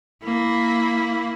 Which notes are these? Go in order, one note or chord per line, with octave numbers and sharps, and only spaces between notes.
A#3 E4